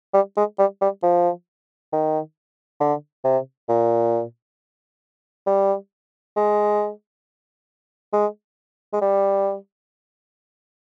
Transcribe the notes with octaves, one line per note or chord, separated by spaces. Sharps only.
G3
G#3
G3
G3
F3
D#3
D3
C3
A#2
G3
G#3
G#3
G#3
G3